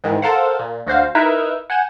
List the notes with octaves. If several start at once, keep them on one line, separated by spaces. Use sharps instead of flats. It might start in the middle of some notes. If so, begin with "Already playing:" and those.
G#2 D#3 E3
A4 A#4 C5 F5 F#5
A#2
D2 F#4 C5 F5
D#4 E4 A#4 B4 E5
F#5 G#5 G6 E7